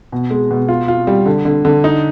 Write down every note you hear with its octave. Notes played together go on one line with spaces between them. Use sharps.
B2
G#3
B2
F4
F4
G3
D3
D3
D3
D#4